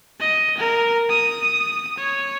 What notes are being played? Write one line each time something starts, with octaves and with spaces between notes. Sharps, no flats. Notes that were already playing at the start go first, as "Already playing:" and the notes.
D#5
A#4
D#6
C#5